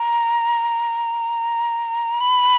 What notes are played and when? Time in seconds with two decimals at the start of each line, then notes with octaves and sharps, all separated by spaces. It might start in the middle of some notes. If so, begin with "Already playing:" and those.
Already playing: A#5
2.20 B5